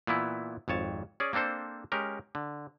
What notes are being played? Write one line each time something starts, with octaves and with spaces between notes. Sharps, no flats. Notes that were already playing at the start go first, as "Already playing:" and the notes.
A#2 E3 B3 E4
G#1 F2 C#5 A5
C#4 G#4 D5
A#3 C4 D4 A4 C5
G#3 C#4 G4 A#4
D3